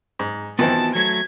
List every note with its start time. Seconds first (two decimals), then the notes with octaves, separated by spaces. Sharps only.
0.19 G#2
0.59 D#3 E3 B3 C4 F4 F#4 A5
0.95 F#3 A3 G#6